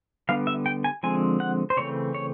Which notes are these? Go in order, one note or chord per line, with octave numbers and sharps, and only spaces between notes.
D3 G3 B3 F5
E5
G5
G#5
D3 F3 G#3 C4 G#5
F#5
C5
C#3 E3 A3 C4 C#5
C#5